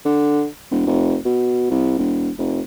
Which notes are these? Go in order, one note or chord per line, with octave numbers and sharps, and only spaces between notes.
D3
E1
F1
B2
C2
E1
F1